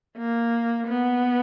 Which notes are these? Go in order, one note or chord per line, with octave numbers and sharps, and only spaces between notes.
A#3
B3